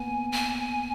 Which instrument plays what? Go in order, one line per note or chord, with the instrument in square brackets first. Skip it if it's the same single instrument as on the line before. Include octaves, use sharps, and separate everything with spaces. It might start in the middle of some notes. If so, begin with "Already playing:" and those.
Already playing: [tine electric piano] A#3 B3 [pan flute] G#5
[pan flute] G#5